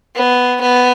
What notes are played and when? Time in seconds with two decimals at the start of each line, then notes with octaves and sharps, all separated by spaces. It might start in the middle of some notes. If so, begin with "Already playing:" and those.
0.16 B3
0.63 B3